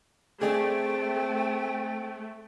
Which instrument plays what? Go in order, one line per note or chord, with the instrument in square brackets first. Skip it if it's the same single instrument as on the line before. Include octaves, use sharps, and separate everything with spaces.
[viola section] A3 [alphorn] C4 [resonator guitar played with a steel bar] G#4 D5 [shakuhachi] G5